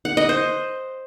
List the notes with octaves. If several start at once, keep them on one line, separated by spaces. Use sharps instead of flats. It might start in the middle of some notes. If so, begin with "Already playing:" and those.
F#5
D#5
C5